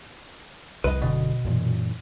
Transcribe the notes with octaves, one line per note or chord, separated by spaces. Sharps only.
C2 F2 B4 D#5
F#1 B2 D3
F#2 A#2 E3